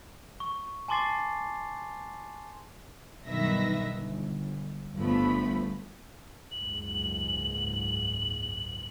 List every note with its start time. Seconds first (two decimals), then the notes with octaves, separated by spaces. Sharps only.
0.40 C#6
0.88 G#5 A5 C6 D6 A6 C7
3.26 B1 G2 D#3 B4 E5 A#6
3.93 G1
4.97 G1 G2 F3 A3 B3 B5
6.51 F#1 C#2 G#2 F#7